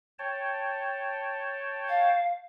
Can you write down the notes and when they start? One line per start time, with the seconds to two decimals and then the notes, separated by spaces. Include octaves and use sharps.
0.19 C#5 G5 A5
1.89 F5